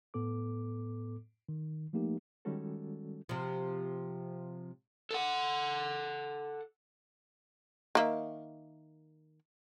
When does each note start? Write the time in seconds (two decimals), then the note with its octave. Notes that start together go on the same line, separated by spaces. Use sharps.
0.14 A2 B3 A4 D6
1.49 D#3
1.93 F3 A3 A#3 D#4 G4
2.45 D#3 G3 G#3 C#4 F#4 A4
3.29 C3 F3
5.11 A4 F#5
7.95 D#3 A#3 E5